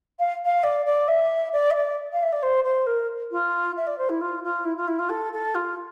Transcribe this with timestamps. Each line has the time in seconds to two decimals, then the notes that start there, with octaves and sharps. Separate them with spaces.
0.19 F5
0.45 F5
0.63 D5
0.86 D5
1.08 E5
1.53 D5
1.70 E5
1.75 D5
2.13 F5
2.23 E5
2.32 D5
2.42 C5
2.64 C5
2.86 A#4
3.31 F4
3.76 E5
3.87 D5
3.98 C5
4.09 E4
4.21 F4
4.43 F4
4.65 E4
4.77 F4
4.87 E4
4.99 F4
5.09 A4
5.32 A4
5.55 F4